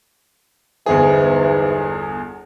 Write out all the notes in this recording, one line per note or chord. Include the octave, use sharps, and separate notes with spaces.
G1 E2 G#2 E3 G#4